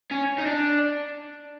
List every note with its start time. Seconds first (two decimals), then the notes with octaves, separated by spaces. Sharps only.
0.11 C#4
0.38 D#4
0.46 D4